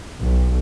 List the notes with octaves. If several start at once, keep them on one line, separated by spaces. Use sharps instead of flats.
B1